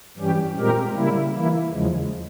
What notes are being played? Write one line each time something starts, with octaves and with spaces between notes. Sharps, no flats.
G2 E3 G3 C#4 G4
A#2 G#3 C4 G4 A#4
C#3 G3 A#3 E4
E3 A#3 E4
E2 C#3 F3 G#3